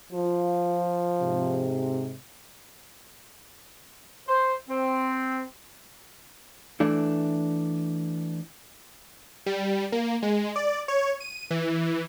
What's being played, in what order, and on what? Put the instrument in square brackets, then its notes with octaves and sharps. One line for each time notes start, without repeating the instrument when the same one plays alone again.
[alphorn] F3 [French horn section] F4
[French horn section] G#2 C3
[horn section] C5
C4
[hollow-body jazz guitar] E3 A3 D4
[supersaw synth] G3
A#3
G#3
D5
C#5
D#7
E3